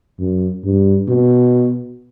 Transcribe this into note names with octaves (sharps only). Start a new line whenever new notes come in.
F#2
G2
B2